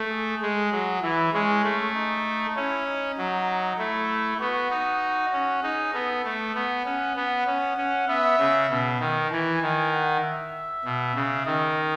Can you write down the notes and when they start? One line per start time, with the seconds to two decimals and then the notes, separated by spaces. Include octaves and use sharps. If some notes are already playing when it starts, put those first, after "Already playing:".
Already playing: A3
0.10 G#4
0.42 G#3
0.71 F#3
1.02 E3 E4
1.33 G#3 C#4
1.63 A3
1.94 D#4
2.56 C#4 E4
2.86 D#4
3.18 F#3
3.78 A3 E4
4.40 B3 F#4
4.70 D#4
5.33 C#4
5.62 D#4 G#4
5.93 B3 A4
6.24 A3
6.55 B3
6.85 C#4 F#5
7.16 B3 F#5
7.47 C#4
7.77 C#4
8.08 B3 E5
8.38 C#3
8.70 B2
9.00 D#3
9.31 E3 G#5
9.62 D#3
9.92 F#5
10.23 E5
10.85 B2
11.15 C#3
11.45 D#3 D#5